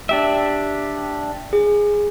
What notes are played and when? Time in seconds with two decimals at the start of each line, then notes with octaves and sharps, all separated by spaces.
0.09 D4 G4 E5
1.53 G#4